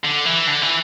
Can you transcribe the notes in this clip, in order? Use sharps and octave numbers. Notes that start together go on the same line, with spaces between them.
D3
E3
D3
E3